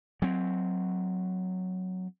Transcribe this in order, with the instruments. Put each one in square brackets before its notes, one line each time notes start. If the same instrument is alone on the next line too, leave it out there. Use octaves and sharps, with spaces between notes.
[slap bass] F#3 C4